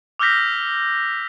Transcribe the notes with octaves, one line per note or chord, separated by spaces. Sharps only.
D6 E6 F6 G6 A#6 B6